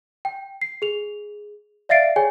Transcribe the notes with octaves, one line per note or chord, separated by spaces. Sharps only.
G5
C7
G#4 F7
D5 E5 F5 A6 C7 D7
G#4 C#5 G5 G#5